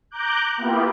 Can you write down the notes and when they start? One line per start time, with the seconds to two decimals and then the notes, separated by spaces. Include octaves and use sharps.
0.11 A#5 D6 F#6 G6
0.57 A#3 B3 E4 F4 G4